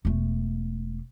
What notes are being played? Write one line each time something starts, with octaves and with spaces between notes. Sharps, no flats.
E1 A3